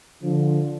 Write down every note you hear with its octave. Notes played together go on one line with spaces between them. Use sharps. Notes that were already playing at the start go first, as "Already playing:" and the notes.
D3 F3